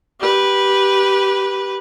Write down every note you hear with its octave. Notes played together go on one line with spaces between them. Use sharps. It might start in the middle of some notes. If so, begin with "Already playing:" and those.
G4 B4